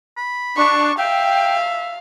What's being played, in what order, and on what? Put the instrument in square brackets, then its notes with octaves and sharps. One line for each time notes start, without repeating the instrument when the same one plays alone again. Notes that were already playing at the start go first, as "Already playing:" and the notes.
[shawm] B5
[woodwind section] D4 [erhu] C#6
[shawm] E5 [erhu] F5 [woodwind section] G5